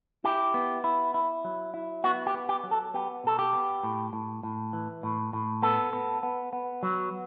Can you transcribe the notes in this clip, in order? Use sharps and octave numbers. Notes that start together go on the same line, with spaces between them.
E4 G4
B3
E4
E4
F#3
E4
B3 F#4
G4
B3
G4
F#3
A4
B3 G4
B2 A4
G4
B3
A2
A2
A2
E3
A2
A2
B3 A4
B3
B3
B3
F#3